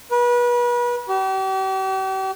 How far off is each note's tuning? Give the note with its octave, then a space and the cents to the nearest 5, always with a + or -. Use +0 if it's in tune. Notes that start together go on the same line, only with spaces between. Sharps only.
B4 -35
G4 -40